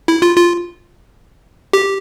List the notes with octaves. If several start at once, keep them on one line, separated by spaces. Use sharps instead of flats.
E4
F4
F4
G4